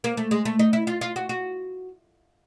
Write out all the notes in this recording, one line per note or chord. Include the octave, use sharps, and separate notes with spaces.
A#3
A3
G#3
A3
D#4
E4
F4
F4
F#4
F#4